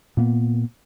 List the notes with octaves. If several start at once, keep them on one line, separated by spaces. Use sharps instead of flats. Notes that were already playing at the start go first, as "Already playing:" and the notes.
A#2 A#3 B3